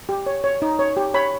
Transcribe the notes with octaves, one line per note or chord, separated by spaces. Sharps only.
G4
C#5
C#5
D#4
C#5
G4
C#5 B5